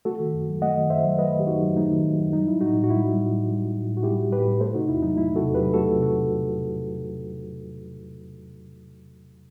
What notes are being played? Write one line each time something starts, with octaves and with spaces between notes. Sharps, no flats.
A3 F#4 A4
D#3
F#2
F#3
A3 D#5 F#5
D#3
F#2 C5 E5
F#3
A3 B4 D#5
D#3
G4
F#2 D#4 F#4
F#3
A3 D#4
D#3
F#2
F#3
G3 D#4
G3 E4
A2 D#4 F#4
A2
F#4
G3 E4
G3
A2
A2
G3
G3
A2
A2
F#4
G3 E4 G4
G3
A2 G4 B4
A2
A3 A4 C5
C3 D#4 F#4
E2 E4
F#3 D#4
A3 E4
C3
F#4 A4
E2
G4 B4
F#3
A3 F#4 A4
C3
F#4 A4